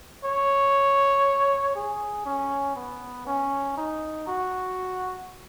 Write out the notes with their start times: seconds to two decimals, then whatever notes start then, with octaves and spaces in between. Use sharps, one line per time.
0.25 C#5
1.76 G#4
2.26 C#4
2.76 B3
3.27 C#4
3.77 D#4
4.27 F#4